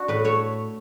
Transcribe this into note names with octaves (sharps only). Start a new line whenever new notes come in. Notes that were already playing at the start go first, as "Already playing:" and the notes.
Already playing: D4 F#4
A2 B4
A3 C#5